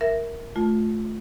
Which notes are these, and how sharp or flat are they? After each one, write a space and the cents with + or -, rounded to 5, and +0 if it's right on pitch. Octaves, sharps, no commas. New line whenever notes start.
A#4 +0 E5 +0
A3 -15 F4 +10